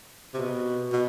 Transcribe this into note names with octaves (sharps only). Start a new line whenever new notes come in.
C3
B2
B2